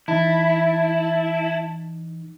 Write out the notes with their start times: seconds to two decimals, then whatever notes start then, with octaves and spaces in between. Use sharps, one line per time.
0.08 E3 D#4 E4 A5